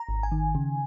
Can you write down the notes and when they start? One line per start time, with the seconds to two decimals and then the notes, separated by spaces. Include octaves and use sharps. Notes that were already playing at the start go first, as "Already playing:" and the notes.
Already playing: A#5
0.09 G#1
0.23 G#5
0.32 D#3
0.55 C#3